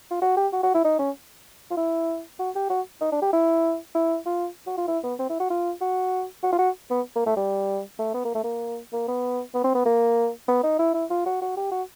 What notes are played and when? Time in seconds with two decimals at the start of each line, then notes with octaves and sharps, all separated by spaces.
0.11 F4
0.22 F#4
0.37 G4
0.53 F#4
0.63 F#4
0.74 E4
0.84 D#4
0.99 C#4
1.71 F4
1.77 E4
2.39 F#4
2.55 G4
2.70 F#4
3.01 D#4
3.12 D4
3.22 G4
3.33 E4
3.95 E4
4.26 F4
4.67 F#4
4.78 F4
4.88 E4
5.03 B3
5.19 C4
5.30 E4
5.40 F#4
5.50 F4
5.81 F#4
6.43 F#4
6.53 F4
6.59 F#4
6.91 B3
7.16 A#3
7.26 A3
7.37 G3
7.99 A3
8.14 B3
8.25 A#3
8.35 A3
8.44 A#3
8.93 A#3
9.08 B3
9.54 B3
9.64 C4
9.75 B3
9.86 A#3
10.48 B3
10.63 D#4
10.79 E4
10.94 E4
11.10 F4
11.26 F#4
11.42 F#4
11.57 G4
11.71 F#4